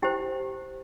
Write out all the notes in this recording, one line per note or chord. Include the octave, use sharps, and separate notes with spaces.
E4 G4 C5 G5